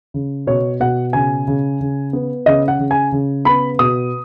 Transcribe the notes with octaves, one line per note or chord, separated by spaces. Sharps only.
C#3
B2 C#5
B2 F#5
C#3 G#5
C#3
C#3
B3
C#3 D#5
F#5
C#3
G#5
C#3
B3 B5
B2 D#6